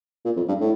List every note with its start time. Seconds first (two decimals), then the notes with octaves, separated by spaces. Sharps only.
0.25 A#2
0.36 F2
0.48 G2
0.60 A2